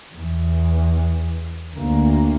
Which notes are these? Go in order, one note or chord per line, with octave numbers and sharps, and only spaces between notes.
E2
D2 A#3